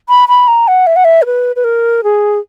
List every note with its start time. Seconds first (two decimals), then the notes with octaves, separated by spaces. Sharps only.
0.09 B5
0.28 B5
0.48 A#5
0.68 F#5
0.87 E5
0.96 F#5
1.04 E5
1.22 A#4
1.26 B4
1.56 B4
1.64 A#4
2.04 G#4